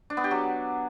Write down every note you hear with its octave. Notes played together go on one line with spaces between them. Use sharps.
D4
B3
G4
F#3